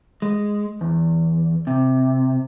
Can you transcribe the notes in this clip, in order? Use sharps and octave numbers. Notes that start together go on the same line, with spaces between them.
G#3
E2
C3